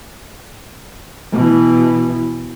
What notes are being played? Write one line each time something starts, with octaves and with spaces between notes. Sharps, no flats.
B2 E3